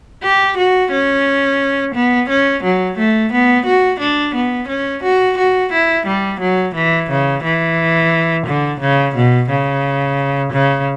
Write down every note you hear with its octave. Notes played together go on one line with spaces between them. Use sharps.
G4
F#4
C#4
B3
C#4
F#3
A3
B3
F#4
D4
B3
C#4
F#4
F#4
E4
G3
F#3
E3
C#3
E3
D3
C#3
B2
C#3
C#3